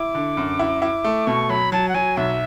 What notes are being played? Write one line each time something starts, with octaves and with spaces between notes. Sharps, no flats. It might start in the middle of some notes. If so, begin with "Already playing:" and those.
Already playing: E4 D6
D3
F#2
E4
E4
A3
B2 C#6
F#3 B5
F#3 A5
F#5
F#3 G#5
B1 E5